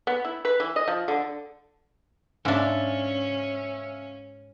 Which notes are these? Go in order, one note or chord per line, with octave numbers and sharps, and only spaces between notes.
B3
E4
B4
E3
D#5
F3
D3
G#2 C#4 D4 E5 F5 G#5